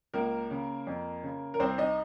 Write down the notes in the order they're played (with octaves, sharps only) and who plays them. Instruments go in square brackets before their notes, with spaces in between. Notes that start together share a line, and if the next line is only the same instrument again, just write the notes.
[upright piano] C#2 A#3 A#4
C#3
F2
C#3
A#4
C2 C4 C5
D#4 D#5